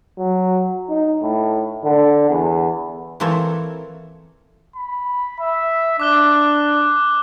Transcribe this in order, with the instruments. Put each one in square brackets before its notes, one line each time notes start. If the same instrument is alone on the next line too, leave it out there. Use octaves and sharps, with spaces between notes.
[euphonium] F#3
D#4
A2
D3
E2
[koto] E3 A#3 C4 A4 C#5
[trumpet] B5
E5
[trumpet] D4 [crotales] D6 F#6 G7